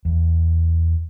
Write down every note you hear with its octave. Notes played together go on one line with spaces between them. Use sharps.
E2